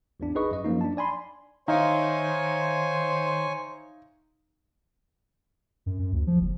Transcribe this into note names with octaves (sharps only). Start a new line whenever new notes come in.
A1 E2 D4
D#4 G#4 B4 D#5 C#6
F#2 D#5
F#2 F3 A#3 D#4
D4 A5
D5 G#5 B5 C6
D#3 D#4 C5 C#5 E5 F5 G#5
F#2
F#2
D2
F3
F#1